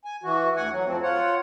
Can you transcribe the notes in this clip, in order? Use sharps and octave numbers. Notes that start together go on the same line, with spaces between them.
G#5
E3 F#4
D2 F#5 G#5
F#3
F2 F3 C4
F4 C#5 F#5